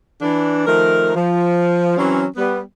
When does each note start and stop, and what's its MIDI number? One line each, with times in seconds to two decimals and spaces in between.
0.21 0.64 52
0.21 0.64 62
0.67 1.15 51
0.67 1.15 53
0.67 1.15 57
0.67 1.15 70
1.15 1.94 53
1.98 2.26 52
1.98 2.26 54
1.98 2.26 60
1.98 2.26 61
2.36 2.59 55
2.36 2.59 59